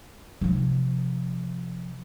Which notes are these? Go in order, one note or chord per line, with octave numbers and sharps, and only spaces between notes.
C3 F3